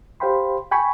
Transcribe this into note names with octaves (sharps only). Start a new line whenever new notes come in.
G4 C5 F5 G5 B5 C6
G5 G#5 B5 C#6